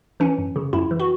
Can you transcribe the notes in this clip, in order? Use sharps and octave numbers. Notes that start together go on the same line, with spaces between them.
E3 C#4
F#2
C#3
F#2 E4
E3
F#4